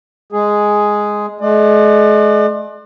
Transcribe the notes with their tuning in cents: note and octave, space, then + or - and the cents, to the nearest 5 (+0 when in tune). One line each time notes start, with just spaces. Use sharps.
G#3 +0 G#4 +0
G#3 +40 D5 +40